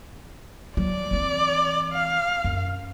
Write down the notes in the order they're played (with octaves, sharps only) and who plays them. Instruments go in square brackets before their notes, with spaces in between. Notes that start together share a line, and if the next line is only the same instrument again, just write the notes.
[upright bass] F#3 [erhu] D5
[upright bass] E3 C4
[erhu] F5
[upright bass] F#2